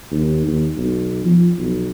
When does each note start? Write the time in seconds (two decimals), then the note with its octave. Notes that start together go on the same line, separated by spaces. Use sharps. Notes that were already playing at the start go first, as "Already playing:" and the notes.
0.11 D#2
0.48 D#2
0.77 B1
1.24 F3
1.58 B1